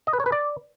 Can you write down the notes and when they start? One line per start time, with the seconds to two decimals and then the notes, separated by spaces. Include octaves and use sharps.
0.07 D#5
0.13 B4
0.20 C#5
0.26 B4
0.32 D5